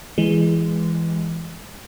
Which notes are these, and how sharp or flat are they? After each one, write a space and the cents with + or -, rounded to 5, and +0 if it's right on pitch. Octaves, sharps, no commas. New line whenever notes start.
E3 +10 G#3 +0